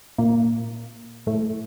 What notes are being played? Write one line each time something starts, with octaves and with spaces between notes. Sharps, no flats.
A#2 A#3
A2 A3